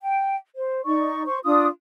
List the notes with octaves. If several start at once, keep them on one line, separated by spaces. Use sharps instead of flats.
G5
C5
D#4 D5 C#6
C5 C#6
D4 F4 D#6